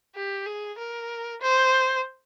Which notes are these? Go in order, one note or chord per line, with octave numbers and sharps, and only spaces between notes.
G4
G#4
A#4
C5